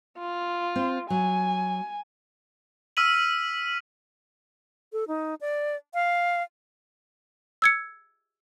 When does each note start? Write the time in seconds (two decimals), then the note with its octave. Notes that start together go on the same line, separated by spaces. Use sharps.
0.19 F4
0.76 C4
1.10 F#3 G#5
2.97 E6 F6 B6 D#7 F#7
4.93 A4
5.08 D#4
5.41 D5
5.94 F5
7.62 E6 G#6 C#7